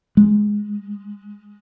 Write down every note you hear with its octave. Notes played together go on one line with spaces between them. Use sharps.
G#3